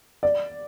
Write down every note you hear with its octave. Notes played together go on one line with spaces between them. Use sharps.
D5